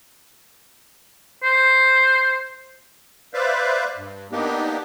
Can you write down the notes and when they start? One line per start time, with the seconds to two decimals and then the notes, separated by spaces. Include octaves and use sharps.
1.43 C5
3.34 B4 C5 D5 E5 F5
3.97 G2
4.32 A#3 B3 D4 D#4 G4